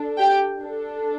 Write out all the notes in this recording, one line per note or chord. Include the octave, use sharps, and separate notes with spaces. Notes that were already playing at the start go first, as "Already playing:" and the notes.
Already playing: D4 A4
G4 G5
D4 A4